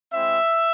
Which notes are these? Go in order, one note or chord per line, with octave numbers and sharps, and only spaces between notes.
G#3 C4 E4 E5